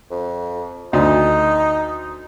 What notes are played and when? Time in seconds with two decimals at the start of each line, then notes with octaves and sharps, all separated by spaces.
0.11 F2
0.93 D2 D#4